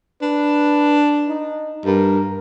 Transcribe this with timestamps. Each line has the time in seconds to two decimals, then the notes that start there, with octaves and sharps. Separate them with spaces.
0.22 D4 B4
1.28 D#4
1.86 G2 A#4